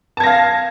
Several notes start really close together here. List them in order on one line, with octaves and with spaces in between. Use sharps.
A5 G#6 A#6 F5